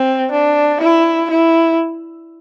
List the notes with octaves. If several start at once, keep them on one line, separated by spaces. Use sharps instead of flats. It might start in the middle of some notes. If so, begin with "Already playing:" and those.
Already playing: C4
D4
E4
E4